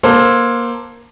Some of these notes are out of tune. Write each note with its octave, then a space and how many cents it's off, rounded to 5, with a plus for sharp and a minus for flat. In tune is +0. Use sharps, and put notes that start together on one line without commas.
A#3 +20 A4 +10 C5 +5